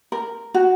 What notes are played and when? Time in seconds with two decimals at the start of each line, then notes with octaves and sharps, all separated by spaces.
0.12 A#4
0.54 F#4